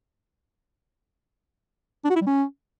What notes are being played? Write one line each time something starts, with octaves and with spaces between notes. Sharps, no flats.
D4
F#4
E4
G3
C#4